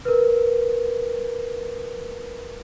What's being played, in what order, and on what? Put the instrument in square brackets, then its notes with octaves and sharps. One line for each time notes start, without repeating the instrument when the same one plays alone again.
[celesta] A#4 B4